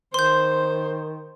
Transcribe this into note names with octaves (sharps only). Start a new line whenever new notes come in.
D#3 C5 C6 G6